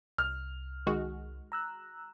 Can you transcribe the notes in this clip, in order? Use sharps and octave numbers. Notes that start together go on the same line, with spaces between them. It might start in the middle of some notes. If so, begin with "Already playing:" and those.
C2 F6
D#3 G#3 F#4
A#5 E6 F#6